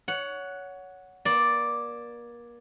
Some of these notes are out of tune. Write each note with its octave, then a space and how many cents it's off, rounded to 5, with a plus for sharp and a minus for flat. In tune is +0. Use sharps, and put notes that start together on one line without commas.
C#5 +20 F#5 -5
A#3 +35 D5 +0